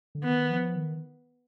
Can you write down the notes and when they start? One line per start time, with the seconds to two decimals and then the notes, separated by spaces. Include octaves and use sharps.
0.15 D3
0.24 D#3 B3
0.50 F3
0.75 D#3